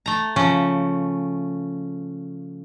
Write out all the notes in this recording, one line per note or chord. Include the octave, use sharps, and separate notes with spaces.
A3 A#5
C#3 F3 C#4